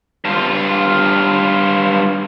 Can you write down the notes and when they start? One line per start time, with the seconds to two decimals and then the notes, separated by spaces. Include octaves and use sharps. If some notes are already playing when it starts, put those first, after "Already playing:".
0.25 G2 F4